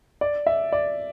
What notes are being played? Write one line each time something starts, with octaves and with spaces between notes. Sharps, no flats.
D5
E5
D5